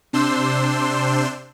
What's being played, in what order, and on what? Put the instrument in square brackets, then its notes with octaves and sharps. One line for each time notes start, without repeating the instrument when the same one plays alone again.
[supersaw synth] C3 D4 C5 C6 E6